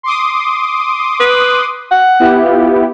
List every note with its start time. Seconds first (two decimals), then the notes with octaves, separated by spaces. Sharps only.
0.03 C6 D6 D#6
1.20 B4
1.91 F#5
2.20 B3 E4 G4
2.45 F4